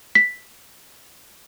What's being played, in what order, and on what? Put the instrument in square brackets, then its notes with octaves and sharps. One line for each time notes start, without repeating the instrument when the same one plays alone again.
[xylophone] B6